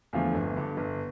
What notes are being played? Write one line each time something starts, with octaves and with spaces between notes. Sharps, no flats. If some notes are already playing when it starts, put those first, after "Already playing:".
E2 D3 F3 A3
G1
G2 D3
G1